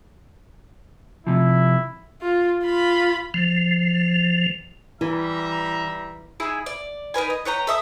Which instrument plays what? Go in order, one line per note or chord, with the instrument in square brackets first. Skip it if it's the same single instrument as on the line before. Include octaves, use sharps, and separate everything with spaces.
[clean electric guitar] C3 F3 [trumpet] E4
[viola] F4
F4 B5
[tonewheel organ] F3
[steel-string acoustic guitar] E3 [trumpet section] G3 E5 A#5 [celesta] E4
[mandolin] D#4 E4 G#4 B5
D5
D#4 A#4 B4 G#5
D#5
B4 C#5 G5 A#5
A4 E5 D#6